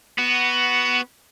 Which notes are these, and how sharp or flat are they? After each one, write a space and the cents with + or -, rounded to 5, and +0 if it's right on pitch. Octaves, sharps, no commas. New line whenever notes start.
B3 +0 F#4 +10